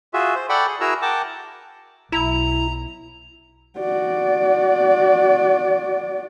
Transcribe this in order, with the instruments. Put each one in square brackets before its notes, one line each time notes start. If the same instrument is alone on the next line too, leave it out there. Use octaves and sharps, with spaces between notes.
[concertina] F4 F#4 G#4 E5
C5
A4 D5 F#5 G5 B5 C#6
G#4
E4 F#4 G#4 A#4 A#5 E6
A#4 F#5 G5 A5 D6
[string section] B1 [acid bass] E4 [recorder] A#5
[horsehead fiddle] F#4 D5